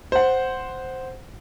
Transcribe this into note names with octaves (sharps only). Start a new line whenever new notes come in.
C5 F#5